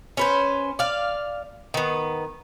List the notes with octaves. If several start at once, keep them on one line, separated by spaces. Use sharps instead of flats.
C#4 B4 C5
D5 F5
D#3 B3